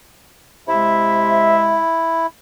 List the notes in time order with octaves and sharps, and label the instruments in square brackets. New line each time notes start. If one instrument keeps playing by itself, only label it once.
[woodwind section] C3 G#3 E5 [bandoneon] E4